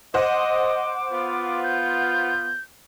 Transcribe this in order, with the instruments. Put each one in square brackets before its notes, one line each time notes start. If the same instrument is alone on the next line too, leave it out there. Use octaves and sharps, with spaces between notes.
[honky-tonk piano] C5 F#5 [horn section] D#5 [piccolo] D6
[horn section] B3 F4
[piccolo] G6